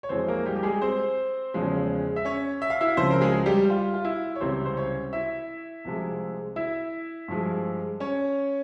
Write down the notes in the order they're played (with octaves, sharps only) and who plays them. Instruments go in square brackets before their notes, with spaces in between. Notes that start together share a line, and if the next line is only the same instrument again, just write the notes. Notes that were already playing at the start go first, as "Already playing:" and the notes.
[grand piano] C#5
F2 E3 G#3 C4 C5
A#3 A#4
G3 G4
G4
G#3 G#4
C4 C5
E2 C#3 F3 G#3
E5
C#4 C#5
E5
F5
E4 E5
C#2 C#3 F3 C4 C5
A#4
G#3 G#4
G3 G4
F4
F4
E4
C#5
C#2 C3 E3 G3 C4 C5
C5
C#4 C#5
E4 E5
C2 C3 F3 G#3
E4 E5
G2 F3 G#3
C#4 C#5